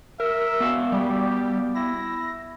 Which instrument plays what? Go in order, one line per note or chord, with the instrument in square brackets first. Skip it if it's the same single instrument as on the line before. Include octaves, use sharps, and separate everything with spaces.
[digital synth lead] A#4 [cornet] E5
[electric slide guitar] B3 F#4 F5
[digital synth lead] G3 [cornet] G4
[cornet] E4 [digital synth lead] A#6